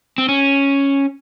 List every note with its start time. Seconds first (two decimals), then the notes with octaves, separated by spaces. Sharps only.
0.18 C4
0.28 C#4